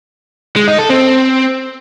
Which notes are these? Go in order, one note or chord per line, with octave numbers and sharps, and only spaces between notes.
G#3
D#4
A4
C4